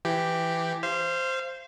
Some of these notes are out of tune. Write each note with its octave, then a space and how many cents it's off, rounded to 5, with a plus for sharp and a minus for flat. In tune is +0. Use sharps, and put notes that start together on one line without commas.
E3 +15 G4 +0
C5 +0 F5 -30